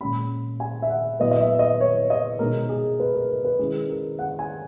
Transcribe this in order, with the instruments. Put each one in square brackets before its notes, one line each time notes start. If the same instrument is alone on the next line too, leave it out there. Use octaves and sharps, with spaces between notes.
[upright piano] A#2 G#3 C#4 B5
G#5
E5
F#5
A#2 F#3 B3 E4 D#5
D#5
E5
D#5
C#5
D#5
B2 G#3 D#4 A#4
G#4
B4
A#4
A#4
B4
D#3 G#3 C#4 E4 G#4
A#4
F#5
G#5